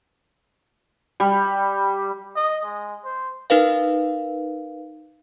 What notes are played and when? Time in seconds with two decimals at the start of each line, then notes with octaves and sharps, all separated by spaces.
1.20 G3
2.36 D#5
2.64 G#3
3.04 C5
3.50 D#4 A#4 B4 F5